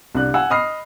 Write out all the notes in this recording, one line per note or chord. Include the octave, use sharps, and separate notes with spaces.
C2 D4 F#6
F#5 G#5 E6
D#5 B5 D#6 F6 C7